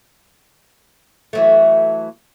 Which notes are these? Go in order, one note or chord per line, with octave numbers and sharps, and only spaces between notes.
E3 F#3 A3